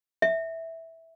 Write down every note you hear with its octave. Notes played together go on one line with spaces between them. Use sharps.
E5